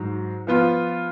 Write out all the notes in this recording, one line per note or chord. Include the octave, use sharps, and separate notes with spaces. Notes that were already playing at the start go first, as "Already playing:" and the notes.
Already playing: G#2 F#3
F3 B3 F4